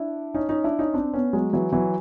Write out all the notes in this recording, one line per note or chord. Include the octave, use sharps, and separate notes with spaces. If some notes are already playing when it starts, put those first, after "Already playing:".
Already playing: D4 E4
C#4 D#4
C#4 D#4
D4 E4
C#4 D#4
C4 D4
B3 C#4
F#3 G#3
E3 F#3
E3 F#3